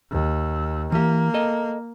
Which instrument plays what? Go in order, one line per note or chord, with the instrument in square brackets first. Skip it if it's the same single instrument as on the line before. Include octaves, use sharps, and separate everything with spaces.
[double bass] D#2
[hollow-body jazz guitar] E3 G4 [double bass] A#3
[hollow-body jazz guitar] A4 D#5